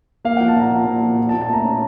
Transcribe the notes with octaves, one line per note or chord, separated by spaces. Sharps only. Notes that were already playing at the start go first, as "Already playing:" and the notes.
A#3 F5
F3 F#5
A5
A#2 A#5
F3
A#2
F3
A#2
A5
A#2
A5
A3 A#5
C#4